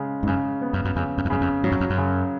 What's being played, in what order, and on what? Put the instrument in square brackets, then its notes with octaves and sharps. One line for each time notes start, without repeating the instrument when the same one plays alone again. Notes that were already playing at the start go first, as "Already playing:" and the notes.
Already playing: [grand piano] C#3 G#3
[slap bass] G#2
[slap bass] F#2 [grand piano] C#3
[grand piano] B3
[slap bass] F#2
F#2
[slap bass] F2 [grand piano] C#3
[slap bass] F#2
F2
[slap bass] F#2 [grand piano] C#3
[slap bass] F2
[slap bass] G#2 [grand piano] F#3
[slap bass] F#2
F2
F#2
[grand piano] C#3